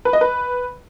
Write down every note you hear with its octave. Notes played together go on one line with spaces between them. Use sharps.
B4
D#5
B4